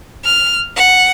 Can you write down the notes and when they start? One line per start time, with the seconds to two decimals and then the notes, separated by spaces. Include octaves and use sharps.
0.24 F6
0.75 F#5